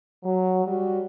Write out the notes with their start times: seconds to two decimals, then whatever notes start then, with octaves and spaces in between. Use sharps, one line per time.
0.24 F#3
0.65 G3 F#4